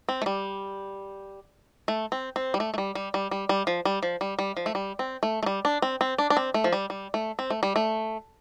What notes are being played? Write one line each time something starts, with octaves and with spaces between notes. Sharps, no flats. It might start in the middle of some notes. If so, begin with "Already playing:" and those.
C4
A3
G3
A3
C4
C4
G3
A3
A3
G3
G3
G3
G3
G3
F3
G3
F3
G3
G3
F3
A3
G3
C4
A3
A3
G3
D4
C4
C4
D4
D4
C4
A3
F3
G3
G3
A3
C4
A3
G3
A3